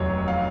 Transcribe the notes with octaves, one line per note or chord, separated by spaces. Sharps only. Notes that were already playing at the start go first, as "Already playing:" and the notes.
Already playing: F1 D#2 D#3 F#3 C#5
F5